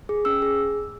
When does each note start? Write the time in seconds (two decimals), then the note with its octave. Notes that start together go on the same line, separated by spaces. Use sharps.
0.09 G#4
0.25 C#4 E6
0.42 G#4